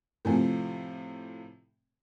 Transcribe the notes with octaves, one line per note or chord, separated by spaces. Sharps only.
A2 C3 F3